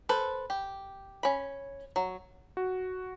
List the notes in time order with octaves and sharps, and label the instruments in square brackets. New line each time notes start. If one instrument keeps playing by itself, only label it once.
[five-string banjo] A4 B4 C5
G4
C#4 B5
F#3
[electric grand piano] F#4